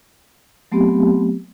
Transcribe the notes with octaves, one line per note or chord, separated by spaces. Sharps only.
F#3 A3 B3 C4 G4